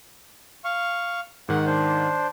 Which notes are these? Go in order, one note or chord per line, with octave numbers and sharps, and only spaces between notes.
F5 C#6
G#2 D#3 F#5
D4 C5